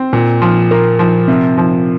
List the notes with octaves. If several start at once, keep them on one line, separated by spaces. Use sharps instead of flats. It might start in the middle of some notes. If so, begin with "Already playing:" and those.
Already playing: C4
A#2
F3
A#3
F3
C3
F3